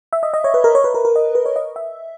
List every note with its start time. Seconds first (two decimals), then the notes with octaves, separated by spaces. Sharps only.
0.13 E5
0.23 D#5
0.34 D#5
0.44 C#5
0.54 B4
0.64 A#4
0.75 C#5
0.84 B4
0.94 A#4
1.05 A#4
1.16 D#5
1.35 B4
1.46 C#5
1.56 D#5
1.76 E5